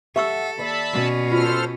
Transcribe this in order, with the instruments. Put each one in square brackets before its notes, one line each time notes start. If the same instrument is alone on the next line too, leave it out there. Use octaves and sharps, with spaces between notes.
[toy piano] G4 C#6 E6 [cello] A4 [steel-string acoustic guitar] E5 F#5
[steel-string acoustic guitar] D#2 D5 [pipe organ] E5 A5 B5
[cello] B2 C#4
[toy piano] F4 [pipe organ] A4 C5 F6